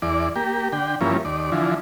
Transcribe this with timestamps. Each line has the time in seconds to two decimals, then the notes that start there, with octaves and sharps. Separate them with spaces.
0.02 E2 D5
0.36 A#3 G4
0.72 D3 G5
1.01 G2 E3 F3 A#3 C#4
1.25 D#2 D5
1.52 D3 E3 F3